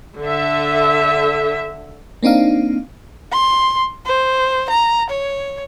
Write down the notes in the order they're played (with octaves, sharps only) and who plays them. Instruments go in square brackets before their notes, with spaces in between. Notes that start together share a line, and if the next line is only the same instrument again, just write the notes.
[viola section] D3 E5
[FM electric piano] A#3 C4 D4 D#4 F5
[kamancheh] C6
C5
A#5
C#5